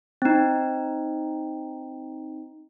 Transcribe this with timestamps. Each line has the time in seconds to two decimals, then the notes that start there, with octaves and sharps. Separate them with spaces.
0.22 C4 D#4